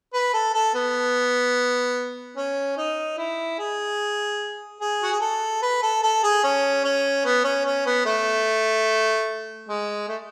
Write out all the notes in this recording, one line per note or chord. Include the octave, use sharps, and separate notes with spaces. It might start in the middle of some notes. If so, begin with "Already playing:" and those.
B4
A4
A4
B3
C#4
D#4
E4
G#4
G#4
F#4
G#4
A4
B4
A4
A4
G#4
C#4
C#4
B3
C#4
C#4
B3
A3
G#3
A3